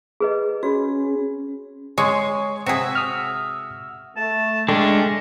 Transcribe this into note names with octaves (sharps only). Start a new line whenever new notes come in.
G#4 B4 D#5
C#4 F#4 G#4 C#5 B5
G#3 C#5 G#5 C6
C3 F#4 G#4 E5
D#6 F6
A3 A5
G#3 C#4 D4 A4 G5 C#6